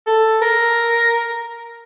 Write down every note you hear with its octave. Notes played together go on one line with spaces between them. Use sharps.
A4
A#4